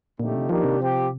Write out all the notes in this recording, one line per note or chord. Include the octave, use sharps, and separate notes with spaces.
F2 A#2 D3 A3 D#4 G4
C3
D#3 F3 A#3 D4 G4
C3
F3 C4 G4